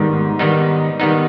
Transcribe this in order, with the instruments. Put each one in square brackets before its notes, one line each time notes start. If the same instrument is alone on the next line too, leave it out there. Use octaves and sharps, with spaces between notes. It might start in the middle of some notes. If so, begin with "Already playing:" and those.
Already playing: [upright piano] G#2 [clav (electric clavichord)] D#3 G3 B3 D#4
[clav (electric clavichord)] D#3 G3 B3 D#4
D#3 G3 B3 D#4